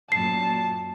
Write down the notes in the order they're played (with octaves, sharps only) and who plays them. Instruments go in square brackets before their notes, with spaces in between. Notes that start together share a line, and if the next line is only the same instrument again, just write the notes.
[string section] F#2 A#2 [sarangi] A5 [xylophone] C7